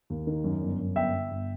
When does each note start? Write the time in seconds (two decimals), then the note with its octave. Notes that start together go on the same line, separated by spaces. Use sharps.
0.10 D#2
0.27 D#3
0.44 F#2
0.61 G1
0.79 F#2
0.96 G1 E5 G5
1.13 G1
1.31 G1